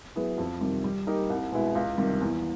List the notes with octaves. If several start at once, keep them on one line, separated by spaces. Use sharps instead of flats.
F#3 B3 E4 G#4
F2
C3 D#3 G3
G3
A#3 D#4 G4 A#4
C2
B2 G#3 B3 E4
C#2
C3 D#3 G3
E2